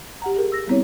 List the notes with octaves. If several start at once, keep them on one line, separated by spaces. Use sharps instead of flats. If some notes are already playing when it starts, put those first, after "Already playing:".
G4 F#5 A#5
G4 G#4 A#4
E6 A#6
G3 B3 C4 E4 C#5